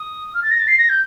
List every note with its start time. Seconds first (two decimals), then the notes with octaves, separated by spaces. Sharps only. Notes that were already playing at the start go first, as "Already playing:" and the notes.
Already playing: D#6
0.34 F6
0.42 A6
0.50 A#6
0.59 A6
0.67 C7
0.78 A#6
0.89 G6